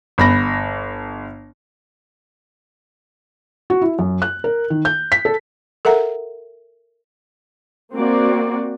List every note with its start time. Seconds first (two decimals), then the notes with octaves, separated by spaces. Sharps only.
0.18 G1 B5 A#6
3.70 F#4
3.81 E4
3.99 F#2
4.22 F#6
4.44 A#4
4.70 D#3
4.85 G6
5.12 B6
5.25 A4
5.85 A4 A#4 E5 F#5 A#5
7.94 A#3 C4 F#4 D5